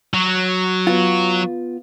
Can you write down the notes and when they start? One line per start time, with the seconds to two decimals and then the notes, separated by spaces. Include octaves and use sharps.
0.14 F#3
0.87 B3 F4